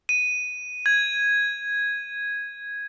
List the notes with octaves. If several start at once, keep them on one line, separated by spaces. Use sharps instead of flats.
D#7
G#6